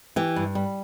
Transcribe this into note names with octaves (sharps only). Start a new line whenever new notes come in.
E3 G4
G2
G3